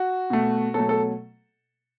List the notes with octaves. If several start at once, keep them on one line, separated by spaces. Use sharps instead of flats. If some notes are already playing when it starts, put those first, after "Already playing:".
Already playing: F#4
B2 A3
B2 F#3 A3 A4
A4